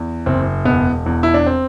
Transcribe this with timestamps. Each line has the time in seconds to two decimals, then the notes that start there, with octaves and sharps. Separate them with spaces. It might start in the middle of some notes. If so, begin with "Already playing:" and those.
Already playing: E2
0.26 F#1 C4
0.65 E1 B3
1.06 E2
1.23 E4
1.34 D4
1.47 C4